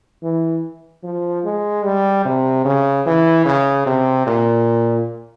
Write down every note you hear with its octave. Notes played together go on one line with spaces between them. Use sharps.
E3
F3
G#3
G3
C3
C#3
E3
C#3
C3
A#2